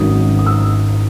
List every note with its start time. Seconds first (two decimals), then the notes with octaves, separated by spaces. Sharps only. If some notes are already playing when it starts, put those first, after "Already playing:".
Already playing: G#1 G#2 D#3 F#3 C#4 D#6
0.39 D#6
0.46 E6